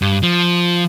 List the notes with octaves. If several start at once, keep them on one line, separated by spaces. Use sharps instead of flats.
G2
F3